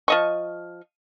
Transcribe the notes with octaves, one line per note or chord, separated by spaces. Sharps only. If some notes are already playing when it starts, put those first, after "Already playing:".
F3 D#5 C#6